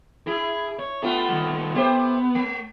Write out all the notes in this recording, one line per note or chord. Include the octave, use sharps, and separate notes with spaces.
E4 G#4
C#5
A3 B3 F4 G4
D#3 G3
B3 G4 C5 E5
A3